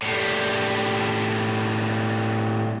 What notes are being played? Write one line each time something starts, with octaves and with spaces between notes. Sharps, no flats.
A2 G3